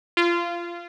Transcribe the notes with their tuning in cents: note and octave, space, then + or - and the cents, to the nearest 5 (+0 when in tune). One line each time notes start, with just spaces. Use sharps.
F4 -20